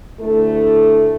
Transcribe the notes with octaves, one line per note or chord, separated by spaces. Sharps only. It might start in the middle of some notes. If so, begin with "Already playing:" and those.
D2 A3 E4 A4